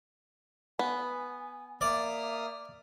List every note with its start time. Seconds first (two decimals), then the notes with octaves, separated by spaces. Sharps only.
0.79 B3 G#5
1.81 A#3 D5 E5 D#6 F6